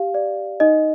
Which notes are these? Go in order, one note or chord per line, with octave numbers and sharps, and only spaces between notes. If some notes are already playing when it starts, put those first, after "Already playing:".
Already playing: G4 F5
D5
D#4 D#5